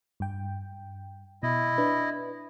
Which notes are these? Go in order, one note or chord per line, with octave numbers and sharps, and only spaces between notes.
G2 G5
B2 E4 D#5
D4 B4